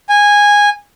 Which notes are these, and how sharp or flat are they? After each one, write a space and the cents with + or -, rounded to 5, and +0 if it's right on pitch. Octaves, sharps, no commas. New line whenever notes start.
G#5 -15